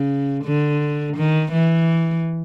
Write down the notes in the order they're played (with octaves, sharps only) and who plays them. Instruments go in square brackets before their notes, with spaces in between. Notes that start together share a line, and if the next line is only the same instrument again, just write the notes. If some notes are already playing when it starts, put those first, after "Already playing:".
Already playing: [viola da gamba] C#3
D3
D#3
E3